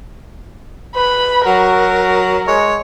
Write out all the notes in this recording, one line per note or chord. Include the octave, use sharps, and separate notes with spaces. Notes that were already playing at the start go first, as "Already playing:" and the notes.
B4 B5
F#3 F#4 A#4
G#3 C#5